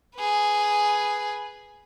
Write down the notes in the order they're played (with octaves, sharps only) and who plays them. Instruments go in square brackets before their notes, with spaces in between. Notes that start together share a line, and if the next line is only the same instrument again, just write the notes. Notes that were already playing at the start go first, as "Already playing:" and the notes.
[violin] G#4 B4